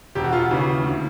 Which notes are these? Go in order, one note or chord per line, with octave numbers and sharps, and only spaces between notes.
E1 G4
F#4
F4
F#4
D#2 C#3 E3
D2